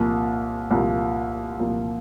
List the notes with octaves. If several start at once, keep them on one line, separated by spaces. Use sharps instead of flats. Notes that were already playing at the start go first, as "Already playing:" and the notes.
Already playing: C2 A#2 F3 A#3
C2 A#2 F3 A#3
C2 A#2 F3 A#3